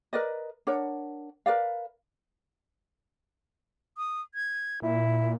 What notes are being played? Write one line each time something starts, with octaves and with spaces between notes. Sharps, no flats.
A#4 B4 D5 D#5
D4 A#4 C#5 F#5
A#4 B4 D5 F5
D#6
G#6
A#2 E4